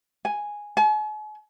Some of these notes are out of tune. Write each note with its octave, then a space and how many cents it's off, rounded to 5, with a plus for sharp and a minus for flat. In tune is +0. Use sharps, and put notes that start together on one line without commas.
G#5 -5
G#5 +45